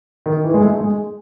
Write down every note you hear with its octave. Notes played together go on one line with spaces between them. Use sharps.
D#3
E3
G#3
A3
G#3